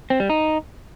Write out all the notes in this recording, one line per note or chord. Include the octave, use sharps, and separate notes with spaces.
C4
G3
D#4